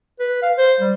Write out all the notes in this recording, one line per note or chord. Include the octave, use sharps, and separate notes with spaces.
B4
F5
C5
G3